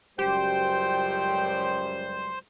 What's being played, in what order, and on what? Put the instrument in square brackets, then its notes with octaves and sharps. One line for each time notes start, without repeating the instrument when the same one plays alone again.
[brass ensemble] C#2 F#2 G3 [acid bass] G4 [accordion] C5 [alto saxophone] G5